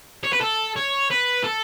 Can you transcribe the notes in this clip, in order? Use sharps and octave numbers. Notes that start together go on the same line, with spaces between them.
C#5
B4
A4
C#5
B4
A4